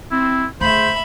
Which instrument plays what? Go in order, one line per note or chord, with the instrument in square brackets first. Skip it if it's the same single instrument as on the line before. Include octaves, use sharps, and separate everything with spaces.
[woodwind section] C4 [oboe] E4
[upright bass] D2 [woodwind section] C#3 A3 [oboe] C5 [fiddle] E5 B5